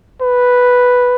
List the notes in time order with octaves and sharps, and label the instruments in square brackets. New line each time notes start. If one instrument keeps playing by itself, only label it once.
[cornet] B4